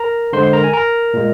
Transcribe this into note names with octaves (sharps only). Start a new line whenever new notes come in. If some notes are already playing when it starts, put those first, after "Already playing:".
Already playing: A#4 A#5
D3 G#3 C5 C6
C6
A#4 A#5
G#5
A#4 A#5
A#2 G#3